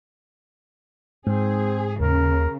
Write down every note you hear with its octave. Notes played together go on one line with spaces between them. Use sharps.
G#2 C4 G#4
D#2 C#3 A#4